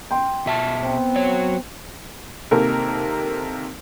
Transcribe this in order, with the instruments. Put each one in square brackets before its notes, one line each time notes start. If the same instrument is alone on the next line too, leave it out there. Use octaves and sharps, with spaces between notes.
[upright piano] G5 C6
[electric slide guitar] B2 E5 A5
[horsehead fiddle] B3 [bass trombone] C4
[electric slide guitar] F#3 C#5
[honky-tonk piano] C3 D#3 A#3 A4 A#4